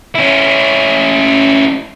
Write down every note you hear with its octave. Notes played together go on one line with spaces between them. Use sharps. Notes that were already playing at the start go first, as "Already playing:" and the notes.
C#4 E4